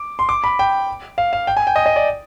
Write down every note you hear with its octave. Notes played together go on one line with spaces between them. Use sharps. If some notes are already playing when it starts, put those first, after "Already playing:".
Already playing: D6
C6
D6
B5
G5
F5
F5
G5
G#5
G5
D#5
D#5
D5